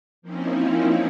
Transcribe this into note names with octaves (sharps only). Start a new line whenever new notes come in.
F3 A#3 C4 C#4 D#4 E4